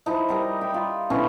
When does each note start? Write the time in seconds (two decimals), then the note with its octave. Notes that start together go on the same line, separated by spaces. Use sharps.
0.06 F3 D#4 E4
0.28 G3 D#4 A#4
0.61 G5 B5
0.74 F4
1.10 B2 D3 C#4 E4